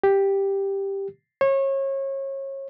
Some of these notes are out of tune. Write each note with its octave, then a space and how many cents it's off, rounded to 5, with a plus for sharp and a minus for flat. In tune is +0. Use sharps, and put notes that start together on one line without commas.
G4 +5
C#5 -30